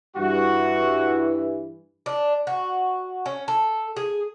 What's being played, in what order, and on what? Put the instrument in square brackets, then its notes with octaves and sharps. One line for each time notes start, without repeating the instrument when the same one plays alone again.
[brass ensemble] G2 E3 [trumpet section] F#4
[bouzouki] D4
F#4
C#4
A4
G#4